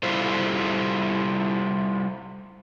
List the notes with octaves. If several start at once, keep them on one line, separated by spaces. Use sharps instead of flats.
G3 E4 F4 A4 C5